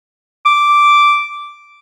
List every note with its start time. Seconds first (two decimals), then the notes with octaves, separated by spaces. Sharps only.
0.46 D6